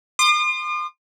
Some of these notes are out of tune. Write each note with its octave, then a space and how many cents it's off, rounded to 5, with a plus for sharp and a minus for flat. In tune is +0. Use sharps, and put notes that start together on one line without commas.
C6 -5 D#6 -45